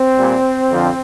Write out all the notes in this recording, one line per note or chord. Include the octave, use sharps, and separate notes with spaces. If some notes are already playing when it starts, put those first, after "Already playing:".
Already playing: C4
A#2 G3
F2 D3 F3